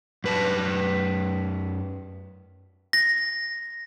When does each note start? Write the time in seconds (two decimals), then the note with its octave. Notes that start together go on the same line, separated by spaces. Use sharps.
0.24 F#2 B4 A5
2.93 A#6